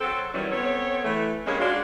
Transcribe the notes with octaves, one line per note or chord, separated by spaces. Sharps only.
F#3 C4 A4
D#3 E3 F#3 G3 C#4
B3 C4 A4 C#5
E3 A3
G2 G#3 A#3 C#4
G#3 D4 F4 F#4